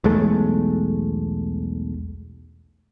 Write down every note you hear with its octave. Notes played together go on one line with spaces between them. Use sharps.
B1 E2 G#3 A3